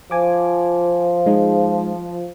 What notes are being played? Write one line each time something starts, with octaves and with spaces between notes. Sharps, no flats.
F3 G#5 D6
G#3 D#4